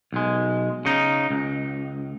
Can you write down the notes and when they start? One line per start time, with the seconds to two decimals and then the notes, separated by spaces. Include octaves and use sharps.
0.13 B1 G#3
0.85 C#3 D#4
1.30 C#2